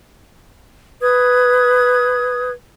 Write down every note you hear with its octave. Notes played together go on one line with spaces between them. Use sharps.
B4 D#6 G#6